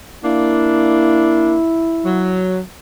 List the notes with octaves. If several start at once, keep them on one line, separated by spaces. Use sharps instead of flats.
A#3 D4 E4
F#3